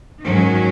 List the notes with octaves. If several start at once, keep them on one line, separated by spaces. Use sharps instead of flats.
G#2 D#3 F#3 C#4